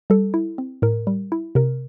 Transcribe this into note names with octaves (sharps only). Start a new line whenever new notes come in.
G3 A4
E4
C4
A2 A#4
G3
E4
C3 A#4